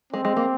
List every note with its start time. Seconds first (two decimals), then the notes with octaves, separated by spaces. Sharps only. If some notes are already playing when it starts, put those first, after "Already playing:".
0.13 G#3 C4
0.25 G#3
0.37 A#3